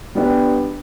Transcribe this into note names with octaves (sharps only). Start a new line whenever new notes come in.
G3 B3 D4 G4